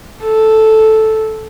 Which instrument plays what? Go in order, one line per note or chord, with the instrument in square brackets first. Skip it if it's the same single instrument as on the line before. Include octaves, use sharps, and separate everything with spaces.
[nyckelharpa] A4